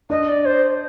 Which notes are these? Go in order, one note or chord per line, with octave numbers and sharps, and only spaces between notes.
D4 D#5
D5
C5